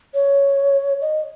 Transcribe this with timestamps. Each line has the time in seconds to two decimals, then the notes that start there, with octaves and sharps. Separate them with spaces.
0.14 C#5
1.01 D#5